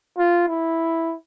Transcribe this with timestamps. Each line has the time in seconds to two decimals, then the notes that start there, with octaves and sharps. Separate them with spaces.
0.18 F4
0.48 E4